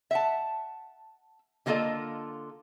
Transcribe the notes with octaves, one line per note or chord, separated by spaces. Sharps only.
E5 F#5 A5
D3 G3 A#3 F4 A4 D#5